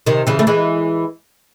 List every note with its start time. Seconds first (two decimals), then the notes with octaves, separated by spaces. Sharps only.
0.06 C3 D#3
0.27 C#3 E3
0.39 A3
0.47 E3 G#3